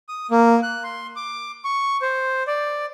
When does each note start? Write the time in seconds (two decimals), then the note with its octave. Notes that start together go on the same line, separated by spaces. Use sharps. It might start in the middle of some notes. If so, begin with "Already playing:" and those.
0.09 D#6
0.31 A#3
0.63 F#6
0.84 C6
1.16 D6
1.64 C#6
2.02 C5
2.47 D5